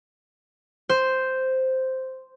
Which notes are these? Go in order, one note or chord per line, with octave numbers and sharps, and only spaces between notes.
C5